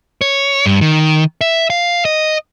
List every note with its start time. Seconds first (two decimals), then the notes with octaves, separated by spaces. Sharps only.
0.21 C#5
0.66 G2
0.81 D#3
1.41 E5
1.70 F5
2.05 D#5